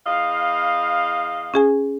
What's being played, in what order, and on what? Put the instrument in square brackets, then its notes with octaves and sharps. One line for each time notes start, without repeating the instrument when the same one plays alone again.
[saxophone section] E2 D#5 F5
[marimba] C#4 G#4 G#5